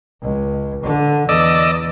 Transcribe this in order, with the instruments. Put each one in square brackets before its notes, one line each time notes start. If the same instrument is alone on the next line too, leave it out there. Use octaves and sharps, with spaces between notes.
[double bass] C#2
D3
[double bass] E2 [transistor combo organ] D5 D#5 E6